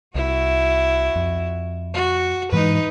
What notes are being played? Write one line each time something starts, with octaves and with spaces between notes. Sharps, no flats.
C2 E4 F#4
F2
F#4
G#2 E3 G#3 D#4 B4